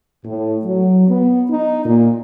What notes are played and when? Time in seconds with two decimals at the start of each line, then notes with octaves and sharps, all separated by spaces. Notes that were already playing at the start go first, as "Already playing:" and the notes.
0.25 A2
0.65 F#3
1.09 B3
1.50 D#4
1.86 A#2